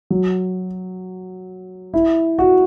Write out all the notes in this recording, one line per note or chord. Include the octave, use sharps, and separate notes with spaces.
F#3
E4
F#4